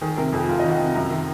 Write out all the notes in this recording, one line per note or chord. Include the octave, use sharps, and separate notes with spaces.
D#3 G#4
C3 A#4
F2 G#4
F2 F4
D#5
D#3
F#5
C3
F#2 A#5
D#3